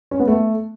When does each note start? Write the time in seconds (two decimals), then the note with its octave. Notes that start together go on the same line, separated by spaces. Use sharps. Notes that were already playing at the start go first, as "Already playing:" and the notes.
0.11 C#4
0.20 B3
0.28 A3